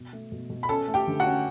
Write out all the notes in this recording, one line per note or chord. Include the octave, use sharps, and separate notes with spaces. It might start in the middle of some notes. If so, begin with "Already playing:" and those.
Already playing: B2
A3
B2
B2
B5
C#4 A4 A5
A3
G4 G5
D3
F#4 F#5
C#4